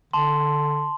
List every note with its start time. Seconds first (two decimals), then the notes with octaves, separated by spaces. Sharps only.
0.13 D3 A5 C6